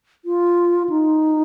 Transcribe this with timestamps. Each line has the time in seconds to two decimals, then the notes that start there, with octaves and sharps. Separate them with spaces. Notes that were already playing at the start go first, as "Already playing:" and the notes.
0.25 F4
0.89 D#4